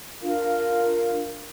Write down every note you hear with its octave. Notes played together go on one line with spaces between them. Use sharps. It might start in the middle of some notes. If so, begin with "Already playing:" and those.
D4 F4 A#4 F5